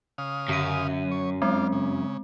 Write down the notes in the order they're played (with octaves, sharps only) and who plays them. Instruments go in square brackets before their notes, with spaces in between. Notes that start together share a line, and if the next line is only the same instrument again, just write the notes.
[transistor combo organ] C#3 F5 D#6
[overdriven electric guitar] F#2 [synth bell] D3 D#7
[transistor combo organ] C#5
[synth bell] G#3 C4 [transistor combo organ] D4 F4
[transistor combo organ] C#3